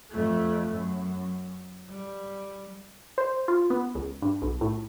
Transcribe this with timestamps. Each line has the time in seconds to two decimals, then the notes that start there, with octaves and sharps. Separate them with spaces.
0.11 F2 A3
0.72 F#2
1.90 G3
3.18 C5
3.48 F4
3.70 B3
3.95 C#2
4.22 G2
4.42 B1
4.61 A2